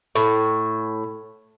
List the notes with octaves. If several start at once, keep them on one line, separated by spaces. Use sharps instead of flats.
A2